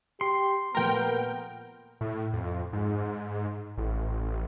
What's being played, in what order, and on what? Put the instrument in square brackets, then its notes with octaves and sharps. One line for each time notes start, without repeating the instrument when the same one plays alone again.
[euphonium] G4 [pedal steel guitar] C6
[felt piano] A#2 F3 A3 [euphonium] B3 [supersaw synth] A#4 G5
[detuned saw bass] A2
F2
G#2
A1